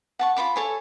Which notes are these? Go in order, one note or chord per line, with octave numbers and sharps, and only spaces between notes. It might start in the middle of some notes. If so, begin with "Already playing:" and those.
F#5 A5 C#6
F4 C#5 B5 D6
A4 C#5 G#5